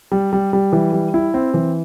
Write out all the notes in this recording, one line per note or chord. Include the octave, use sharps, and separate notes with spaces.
G3
G3
G3
E3
G3
E4
C4
E3